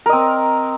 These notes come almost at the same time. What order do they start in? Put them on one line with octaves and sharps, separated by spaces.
A#4 D#5 C4